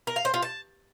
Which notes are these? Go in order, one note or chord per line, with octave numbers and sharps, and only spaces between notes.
A#4
F5
C5
F4
A5